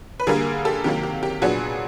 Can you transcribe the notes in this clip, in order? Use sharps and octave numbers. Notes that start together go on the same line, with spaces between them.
B4
D3 G3 A#3 G#4 A#4
G4 A4
C3 D#3 F#3 A#3 G4
G4
G4
A#2 F#3 B3 D4 F#4 G#4